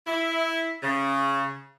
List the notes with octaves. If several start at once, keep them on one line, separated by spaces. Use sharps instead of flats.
E4
C#3